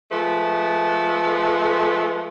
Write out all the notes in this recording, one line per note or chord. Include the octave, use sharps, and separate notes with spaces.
F3 G#3 A3 B4